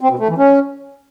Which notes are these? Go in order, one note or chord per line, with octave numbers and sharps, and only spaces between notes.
C4
B2
A3
E3
C#4